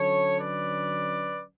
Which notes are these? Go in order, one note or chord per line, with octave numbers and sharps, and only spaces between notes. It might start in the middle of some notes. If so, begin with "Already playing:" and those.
Already playing: D3 F#3 C#4 A4 C#5
B4 D5